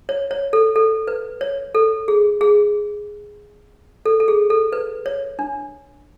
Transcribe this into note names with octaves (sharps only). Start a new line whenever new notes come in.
C#5
C#5
A4
A4
B4
C#5
A4
G#4
G#4
A4
A4
G#4
A4
B4
C#5
D4